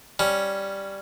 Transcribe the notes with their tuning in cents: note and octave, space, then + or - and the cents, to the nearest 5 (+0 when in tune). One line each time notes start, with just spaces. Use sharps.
G3 +0 C#4 +0